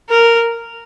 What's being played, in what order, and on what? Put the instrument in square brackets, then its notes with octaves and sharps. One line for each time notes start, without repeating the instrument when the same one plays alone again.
[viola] A#4